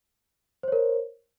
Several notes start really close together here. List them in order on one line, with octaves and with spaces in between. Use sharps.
C5 C#5 A#4